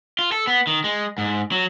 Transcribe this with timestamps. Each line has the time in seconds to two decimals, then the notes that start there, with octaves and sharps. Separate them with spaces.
0.19 F4
0.32 A4
0.47 B3
0.67 D#3
0.84 G#3
1.18 G#2
1.52 F#3